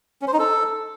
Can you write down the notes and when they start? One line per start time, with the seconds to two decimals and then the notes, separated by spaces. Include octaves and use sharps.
0.22 C#4
0.27 C5
0.33 D#4
0.39 A4